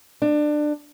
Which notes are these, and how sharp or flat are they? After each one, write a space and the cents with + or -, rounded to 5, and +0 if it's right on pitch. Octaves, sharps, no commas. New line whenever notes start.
D4 +20